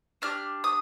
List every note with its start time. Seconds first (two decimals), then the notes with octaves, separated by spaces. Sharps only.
0.22 D4 G4 F6
0.64 D#6